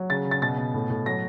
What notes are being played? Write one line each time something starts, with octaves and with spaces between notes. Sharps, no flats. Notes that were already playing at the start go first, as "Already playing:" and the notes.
Already playing: F#3
C#3 A6
C#3
A6
B2 A6
B2
A2
A2
F#3 A#6